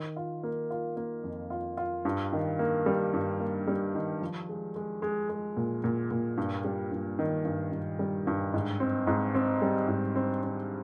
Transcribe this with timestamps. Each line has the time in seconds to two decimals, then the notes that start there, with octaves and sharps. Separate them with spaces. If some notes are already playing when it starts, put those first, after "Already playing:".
Already playing: D#3
0.16 F4
0.43 A#3
0.70 F4
0.97 A#3
1.24 F2
1.50 F4
1.77 F4
2.05 G2
2.33 D#3
2.59 A#3
2.86 G3
3.13 G2
3.40 A#3
3.67 G3
3.95 D#3
4.22 F3
4.49 G#3
4.76 G#3
5.02 G#3
5.29 G#3
5.57 A#2
5.84 A#2
6.11 A#2
6.37 G2
6.65 G3
6.92 G2
7.19 D#3
7.45 G2
7.72 G2
7.99 G3
8.27 G2
8.54 G#2
8.80 C4
9.07 G#2
9.35 C4
9.62 G3
9.88 G#2
10.16 C4
10.43 C4